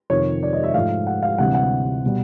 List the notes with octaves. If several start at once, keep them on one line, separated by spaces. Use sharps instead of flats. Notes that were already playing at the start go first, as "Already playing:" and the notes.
F2 C3 D#3 C#5
D5
D#5
E5
G#2 F3 A3 F5
F#5
F5
D2 C3 E3 G3 F#5
F#5
B2 G3